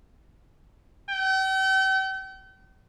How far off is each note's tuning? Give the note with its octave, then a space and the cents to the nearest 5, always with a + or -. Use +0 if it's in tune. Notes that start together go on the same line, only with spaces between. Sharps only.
G5 -40